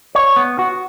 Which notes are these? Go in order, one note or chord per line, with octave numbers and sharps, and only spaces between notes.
C#5
B3
F#4